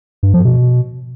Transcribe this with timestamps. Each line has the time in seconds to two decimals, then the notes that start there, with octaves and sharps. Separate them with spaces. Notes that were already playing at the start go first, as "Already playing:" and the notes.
0.23 G2
0.34 F3
0.45 B2